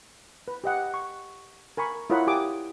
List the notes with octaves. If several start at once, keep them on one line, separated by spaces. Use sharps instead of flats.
B4
G4 D#5 F#5
C#6
A#4 G#5 B5 C#6
E4 F4 A#4 C#5 F#5 B5
G4 G#5 D6 D#6